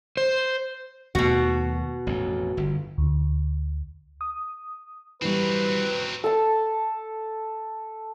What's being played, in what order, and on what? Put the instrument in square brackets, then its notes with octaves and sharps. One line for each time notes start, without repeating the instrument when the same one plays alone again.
[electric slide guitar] C5
[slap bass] D#2 A3 [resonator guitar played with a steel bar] B2 F#4
[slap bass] A1 F2
G1
[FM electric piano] D2
D#6
[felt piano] E3 G3 [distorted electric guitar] F#3 C4 [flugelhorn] B4
[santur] A4 A5